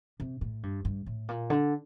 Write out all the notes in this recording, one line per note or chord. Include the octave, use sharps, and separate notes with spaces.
C3
A2
G2
G2
A2
A#2
D3